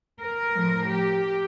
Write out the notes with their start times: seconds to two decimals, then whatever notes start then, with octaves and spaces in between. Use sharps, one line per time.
0.20 A#4
0.56 A2 F3
0.90 G4